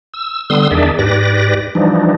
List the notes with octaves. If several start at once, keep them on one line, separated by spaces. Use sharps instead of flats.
E6
D3 G3 B3 C6 D#6 E6
E2 D#3 D4 G#4 D5 E5
G#2 G4 B4 D5 A#6
E3 F3 G3 D4 D#4